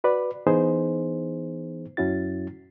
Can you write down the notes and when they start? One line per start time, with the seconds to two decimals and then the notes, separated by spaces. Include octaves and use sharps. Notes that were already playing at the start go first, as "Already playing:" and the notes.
0.04 F#4 B4 D5
0.47 E3 B3 D#4 G#4 C5
1.97 F#2 F#3 C#4 E4 F#4 A6